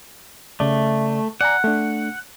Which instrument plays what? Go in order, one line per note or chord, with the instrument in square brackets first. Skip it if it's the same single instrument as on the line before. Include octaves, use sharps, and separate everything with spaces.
[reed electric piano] C#3 D5 [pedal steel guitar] A3
[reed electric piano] D5 G#5 A#5 [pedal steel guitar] F#5
[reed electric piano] A3 D4